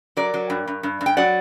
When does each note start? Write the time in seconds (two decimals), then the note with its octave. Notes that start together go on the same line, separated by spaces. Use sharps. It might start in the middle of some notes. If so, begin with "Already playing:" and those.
0.17 F#3 A#4 D5
0.34 F#3
0.50 G2
0.67 G2
0.83 G2
1.01 G2
1.06 G5
1.17 F#3 D5 F#5